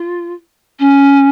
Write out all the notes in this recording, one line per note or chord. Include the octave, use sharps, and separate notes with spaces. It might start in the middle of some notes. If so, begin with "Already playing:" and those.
Already playing: F4
C#4